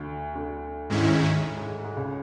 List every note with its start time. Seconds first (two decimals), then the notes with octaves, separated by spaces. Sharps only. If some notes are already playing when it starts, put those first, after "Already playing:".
Already playing: D2 D3
0.35 D2 D3
0.90 G#2 D#3 G#3 C#4 E4
1.43 A2
1.57 G#2
1.84 G#2
1.97 C#2 C#3